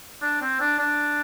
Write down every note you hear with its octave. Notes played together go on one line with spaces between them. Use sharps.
D4
C4
D4
D4